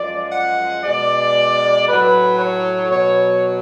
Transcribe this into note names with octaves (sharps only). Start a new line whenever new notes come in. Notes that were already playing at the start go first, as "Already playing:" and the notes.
Already playing: F#2 F3 G#3 D5
F#5
B2 G#3 D5
A2 F#3 B4
C#5
B2 F#3 C#5